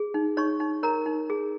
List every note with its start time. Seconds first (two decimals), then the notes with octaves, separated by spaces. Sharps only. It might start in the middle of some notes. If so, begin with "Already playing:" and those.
Already playing: G#4
0.14 D#4
0.37 D#4 C#5 C#6
0.60 D#4
0.83 A#4 C#5 A#5
1.06 D#4
1.30 G#4